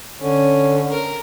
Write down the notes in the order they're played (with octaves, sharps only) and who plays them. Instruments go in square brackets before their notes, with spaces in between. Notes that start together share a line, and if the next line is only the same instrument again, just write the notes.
[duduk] D3 [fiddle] C#4
[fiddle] A#4